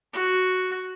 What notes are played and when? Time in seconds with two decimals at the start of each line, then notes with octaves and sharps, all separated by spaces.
0.13 F#4